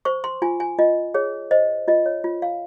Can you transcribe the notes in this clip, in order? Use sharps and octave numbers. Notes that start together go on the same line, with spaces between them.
C5 C#6
C6
F4 G#5
G#5
F4 D#5
G#4 C#5
C5 D#5
F4 D#5
C#5
F4
F5